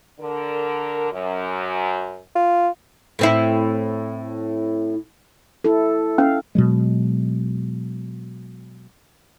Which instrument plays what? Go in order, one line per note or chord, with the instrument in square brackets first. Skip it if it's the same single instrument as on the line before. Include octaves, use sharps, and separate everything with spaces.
[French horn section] D3 A#4
F#2
[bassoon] F4
[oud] A2 C4 E4
[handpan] E4 A4
[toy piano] C#4 [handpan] F5
[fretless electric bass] B2 F#3 G#3